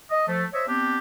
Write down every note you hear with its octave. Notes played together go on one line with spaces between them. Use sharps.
D#5
F3 A3
C5 C#5 D#5 E5
B3 C4 D4 G4